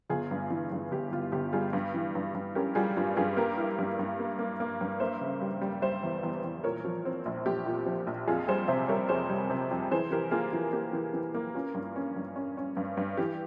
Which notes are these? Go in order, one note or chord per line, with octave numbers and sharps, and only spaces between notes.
G1 F4 G#4
G2
E3
G2
G1 G4
G1 F4
G1 G4
G3 F4 G#4
G2
E3
G2
G2
C#4 G4 A#4
G3 F4 G#4
G2 F4
G2 F4 G#4
A#3 G4 A#4
E4
G2
G2
A#3
A#3
A#3
G2
A#3 C5 E5
C#3
G3
G3
G3 C5 E5
E2
E2
E2
A#2 A#4 C#5
F3
C4
A#1
A#1 G4
A#2
F3
A#1
F2 F4 G#4
G3 G#4 C5
C3 C5 E5
G3 A#4 C#5
F2 G#4 C5
G3
C3
F2
E3 G#4 C5
E3 G4 A#4
A#3 F4 G#4
E3 F4
A#3 G4
E3
E3
A#3
C#4 F4
G2
C#4
G2
C#4
C#4
G2
G2
E3 G4